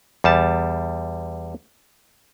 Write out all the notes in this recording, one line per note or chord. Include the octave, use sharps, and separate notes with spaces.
E2 G3 A5